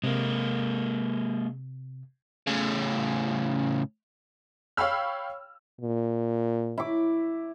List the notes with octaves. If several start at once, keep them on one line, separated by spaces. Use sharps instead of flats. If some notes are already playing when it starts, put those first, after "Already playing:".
C3 G#3 A#3
A2 C#3
C#5 F5 G5 B5 E6 F6
A#2
E4 D6